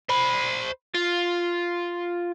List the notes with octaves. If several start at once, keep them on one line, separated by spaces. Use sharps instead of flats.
C5 B5
F4